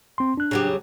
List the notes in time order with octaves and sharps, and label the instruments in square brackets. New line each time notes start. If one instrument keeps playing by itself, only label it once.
[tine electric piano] C4 C6
D4 F#6
[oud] C#3 F#3 G4